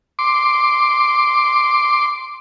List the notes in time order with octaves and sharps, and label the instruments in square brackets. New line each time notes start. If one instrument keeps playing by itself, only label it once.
[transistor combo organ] C6 D6